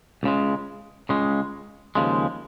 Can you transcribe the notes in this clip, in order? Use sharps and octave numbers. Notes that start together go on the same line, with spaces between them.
C#2 C#3 G#3
C#2 C#3 G#3
D#2 C#3 F3 G#3